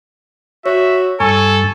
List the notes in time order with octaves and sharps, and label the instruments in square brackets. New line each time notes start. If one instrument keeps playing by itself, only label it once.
[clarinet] F#4 [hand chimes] C#5 [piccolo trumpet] E5
[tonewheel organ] G2 [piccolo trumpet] A4 [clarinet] G#5 [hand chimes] C#6